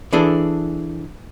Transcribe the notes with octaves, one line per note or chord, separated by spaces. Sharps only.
E3 D4 G#4 A4